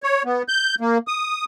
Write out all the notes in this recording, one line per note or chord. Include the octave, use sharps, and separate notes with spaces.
C#5
B3
G6
A#3
D#6